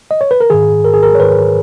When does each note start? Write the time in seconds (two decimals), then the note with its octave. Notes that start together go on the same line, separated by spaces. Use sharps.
0.11 D#5
0.21 C#5
0.31 B4
0.41 A#4
0.50 G#2 D#3 G#4
0.84 A#4
0.94 G#4
1.03 A#4
1.15 C#5
1.19 G#2 D#3 B4